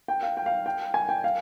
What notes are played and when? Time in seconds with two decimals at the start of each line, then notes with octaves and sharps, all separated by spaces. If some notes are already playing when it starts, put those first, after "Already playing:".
0.08 G5
0.23 F5
0.37 G5
0.46 F5
0.66 G5
0.94 G#5
1.09 G5
1.24 F5